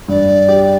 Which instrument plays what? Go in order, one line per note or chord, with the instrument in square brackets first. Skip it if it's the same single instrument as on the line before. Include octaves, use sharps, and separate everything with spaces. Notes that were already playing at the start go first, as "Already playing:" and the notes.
[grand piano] G2 [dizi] D5
[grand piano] G4